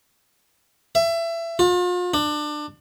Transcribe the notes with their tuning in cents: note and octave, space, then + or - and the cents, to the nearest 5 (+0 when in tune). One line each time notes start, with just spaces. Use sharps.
E5 +25
F4 +40
D4 +25